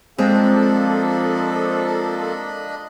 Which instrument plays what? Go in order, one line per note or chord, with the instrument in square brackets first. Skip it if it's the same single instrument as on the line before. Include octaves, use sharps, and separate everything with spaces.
[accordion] F3 A#3 A4 [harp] G#3 [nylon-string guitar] C4 [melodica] D4 D#5 B5